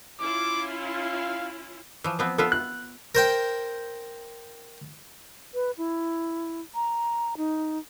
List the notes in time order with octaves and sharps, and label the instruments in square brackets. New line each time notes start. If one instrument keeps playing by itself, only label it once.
[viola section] C#4 E4 F4 [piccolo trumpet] D6
[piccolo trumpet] F5
[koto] E3 F3
F3 B3 C4
[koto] B3 F4 E5 [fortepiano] A4
[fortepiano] F#6
[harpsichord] A#4 C5 G5
[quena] B4
E4
A#5
D#4